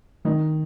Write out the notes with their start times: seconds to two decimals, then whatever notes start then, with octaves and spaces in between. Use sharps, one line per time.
0.25 D#3 D#4